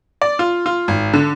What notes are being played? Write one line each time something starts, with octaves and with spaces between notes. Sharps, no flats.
D5
F4
F4
G#1
D3